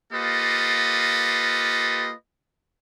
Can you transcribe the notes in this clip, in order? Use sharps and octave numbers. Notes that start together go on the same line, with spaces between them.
A#3 F4 G4 A4 B4 D#5